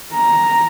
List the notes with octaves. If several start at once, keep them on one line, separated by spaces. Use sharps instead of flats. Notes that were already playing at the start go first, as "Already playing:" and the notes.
A#5